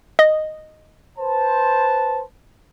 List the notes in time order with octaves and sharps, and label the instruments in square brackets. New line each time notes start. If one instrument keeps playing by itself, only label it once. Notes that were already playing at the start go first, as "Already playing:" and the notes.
[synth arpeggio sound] D#5
[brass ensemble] B4 C5 A5